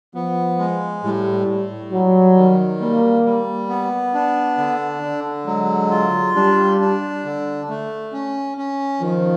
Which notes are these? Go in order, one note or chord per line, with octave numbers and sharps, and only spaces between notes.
F3 B3
G#3
A2 G3
A2
F#3 G3
D#3
G3 A#3
G3
B3
D4
D3
D3
F#3 G#3
F4
G3 D4
D4
D3
A3
C#4
C#4
D#3 F3